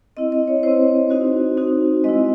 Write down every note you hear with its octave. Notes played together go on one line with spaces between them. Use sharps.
C4 E4 D#5
D#5
C#5
C4 E4 C5
C4 D#4 F#4
C4 D#4 F#4
G#3 C4 E4 D#5